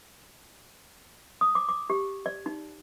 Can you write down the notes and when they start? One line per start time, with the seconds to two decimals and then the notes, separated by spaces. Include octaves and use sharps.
1.41 D#6
1.55 D6
1.69 D6
1.90 G4
2.26 D5
2.46 D#4